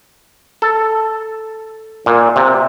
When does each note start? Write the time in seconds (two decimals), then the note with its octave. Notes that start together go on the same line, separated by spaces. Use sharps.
0.62 A4
2.06 A#2
2.36 C3